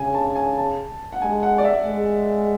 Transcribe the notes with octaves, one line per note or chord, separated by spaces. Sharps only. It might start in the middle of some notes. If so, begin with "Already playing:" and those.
Already playing: C#3 G#5
A5
G#5
A5
F#5
G#3 G#5
F#5
D5
E5
G#3